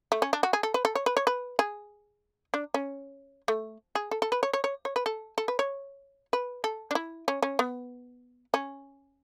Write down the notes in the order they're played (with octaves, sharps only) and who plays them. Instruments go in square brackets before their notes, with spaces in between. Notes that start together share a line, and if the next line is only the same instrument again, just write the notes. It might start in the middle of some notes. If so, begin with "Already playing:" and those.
[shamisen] A3
C#4
D4
F#4
G#4
A4
B4
A4
C#5
B4
C#5
B4
G#4
D4
C#4
A3
G#4
A4
A4
B4
C#5
C#5
C#5
C#5
B4
A4
A4
B4
C#5
B4
A4
D4
E4
C#4
C#4
B3
C#4